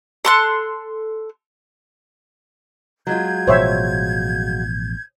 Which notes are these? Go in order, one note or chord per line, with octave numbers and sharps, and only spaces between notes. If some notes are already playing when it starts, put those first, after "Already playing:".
A4 C6 F#6
F#3 G#3 F4 G6 G#6
A1 B2 F3 C5 C#5 E5